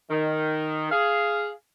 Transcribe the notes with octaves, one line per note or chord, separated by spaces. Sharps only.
D#3
G#4 F5